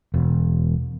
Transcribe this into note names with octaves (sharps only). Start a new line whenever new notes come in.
E1